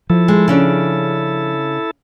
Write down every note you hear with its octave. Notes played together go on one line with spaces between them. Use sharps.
F3 E4 A4
G#3
C#3 C#4 D4